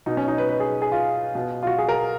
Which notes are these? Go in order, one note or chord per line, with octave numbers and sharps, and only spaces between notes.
B2 D#4
C#4
D#4
B4
B4
G#4
G#4
F4
B2
F4
F#4
G#4
A#4